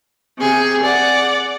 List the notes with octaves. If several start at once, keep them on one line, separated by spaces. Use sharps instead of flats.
C3 G#4
D5 F#5